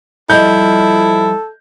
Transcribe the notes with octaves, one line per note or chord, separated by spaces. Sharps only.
F3 G3 E4 A4 D#5 G6